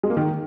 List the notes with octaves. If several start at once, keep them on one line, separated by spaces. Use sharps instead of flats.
G#3
A#3
D#3